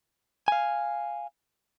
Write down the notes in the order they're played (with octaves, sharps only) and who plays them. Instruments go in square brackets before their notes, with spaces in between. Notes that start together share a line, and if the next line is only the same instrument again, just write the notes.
[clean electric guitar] F5 G#5